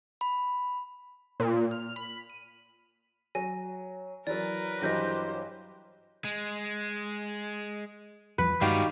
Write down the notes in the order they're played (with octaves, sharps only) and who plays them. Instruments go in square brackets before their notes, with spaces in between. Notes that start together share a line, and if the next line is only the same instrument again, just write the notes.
[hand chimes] B5
[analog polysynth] A#2
F6
B5
D#7
[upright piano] F#3 [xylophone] G#5 A#6
[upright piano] E3 F#3 [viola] A#4 B4 [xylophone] D5
[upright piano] G2 E3 F#3 [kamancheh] G4 C5 [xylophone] D#5 G6 A#6
[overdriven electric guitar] G#3
[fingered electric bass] E2 F3 G3 [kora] B4
[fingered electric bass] G2 G#3 [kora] D#3 [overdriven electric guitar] G3 D#4 [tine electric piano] F#4 G4 F5